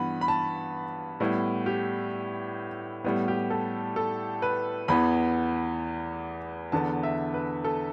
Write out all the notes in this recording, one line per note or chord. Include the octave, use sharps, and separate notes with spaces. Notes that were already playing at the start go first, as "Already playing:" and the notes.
Already playing: G2 E3 B3 B5
B5
A5
A2 G3 B3 E4
G4
A2 G3 B3 E4
G4
A4
A4
B4
E2 E3 B3 B5
E2 D3 B3 A5
E5
B4
A4